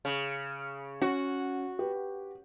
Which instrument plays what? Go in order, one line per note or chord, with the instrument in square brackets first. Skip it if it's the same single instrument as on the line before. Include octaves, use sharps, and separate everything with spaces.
[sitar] C#3
[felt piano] C#4 [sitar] F#4
[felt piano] G4 B4